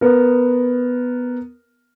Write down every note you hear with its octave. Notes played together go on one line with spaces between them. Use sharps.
B3 A#4